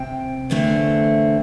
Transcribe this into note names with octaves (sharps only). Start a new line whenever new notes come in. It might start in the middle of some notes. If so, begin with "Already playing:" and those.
Already playing: C3 C4 G5
E2 D3 A3 C4